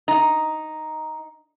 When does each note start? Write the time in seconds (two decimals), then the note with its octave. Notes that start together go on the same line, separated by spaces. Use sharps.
0.08 D#4